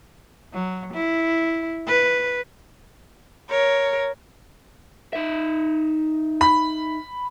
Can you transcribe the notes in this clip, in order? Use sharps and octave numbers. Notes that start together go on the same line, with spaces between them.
F#3
E4
B4
A#4 C#5
D#4 E5
B5